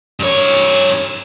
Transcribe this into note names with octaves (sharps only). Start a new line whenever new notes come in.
G2 C#5